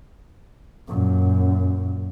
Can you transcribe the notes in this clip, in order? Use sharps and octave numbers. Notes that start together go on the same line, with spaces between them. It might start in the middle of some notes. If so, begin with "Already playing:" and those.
F#2 A#2